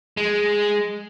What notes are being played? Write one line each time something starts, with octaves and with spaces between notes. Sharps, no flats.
G#3